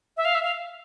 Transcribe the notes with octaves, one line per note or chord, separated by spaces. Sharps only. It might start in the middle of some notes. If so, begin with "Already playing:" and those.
E5
F5
E5
F5